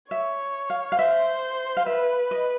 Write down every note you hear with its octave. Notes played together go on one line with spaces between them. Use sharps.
C#5 E5
F5
F5
C5 E5
F5
B4 E5
D#5